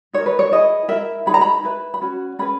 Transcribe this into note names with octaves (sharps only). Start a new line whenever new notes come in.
D#4 A#4 C#5
B4
C#5
E4 G#4 B4 D#5
E4 A#4 E5
D#4 G#4 B4 B5
A#5
B5
E4 B4
B5
C#4 F#4
C#4 G#4 B4 B5